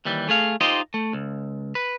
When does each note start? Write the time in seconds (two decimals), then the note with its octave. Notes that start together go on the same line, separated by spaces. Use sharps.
0.05 D#2 E3 G3
0.29 A3 G#4 F5
0.61 D#4 F4 G4 C5 D#5
0.94 A3
1.13 C#2
1.75 B4